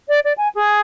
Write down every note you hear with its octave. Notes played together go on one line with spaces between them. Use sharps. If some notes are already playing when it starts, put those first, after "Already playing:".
D5
D5
G#5
G#4